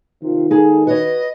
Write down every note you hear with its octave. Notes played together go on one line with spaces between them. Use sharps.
D#2 C3 D#3 F4
G#3 A#3 D#4 G#4 A4
F#4 B4 C#5 D#5